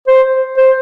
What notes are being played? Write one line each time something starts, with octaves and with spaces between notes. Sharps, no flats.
C5
C5